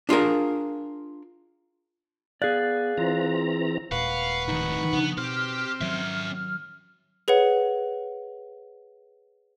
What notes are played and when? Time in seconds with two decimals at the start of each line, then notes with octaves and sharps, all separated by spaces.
0.09 D4 F4 G#4 A#4
2.42 B3 G#4 D5 F5 F#6 A6
2.97 E3 C4 F4 A#5
3.91 D#1 A#2 G#3 B4 F5 F#5 C#6
4.48 A2 D#3 D#4
4.93 C#3 F3 B3 D4
5.17 B2 C4 G4 F6
5.81 D#3 F#3 C#4 E5
7.28 G#4 B4 C#5 F#5